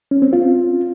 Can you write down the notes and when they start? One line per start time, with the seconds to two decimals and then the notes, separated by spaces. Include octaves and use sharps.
0.11 C#4
0.22 C4
0.33 F4